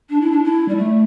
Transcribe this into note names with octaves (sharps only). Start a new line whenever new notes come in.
D4
E4
D4
E4
G3
A3